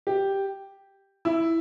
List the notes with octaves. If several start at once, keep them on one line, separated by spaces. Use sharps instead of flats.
G4
E4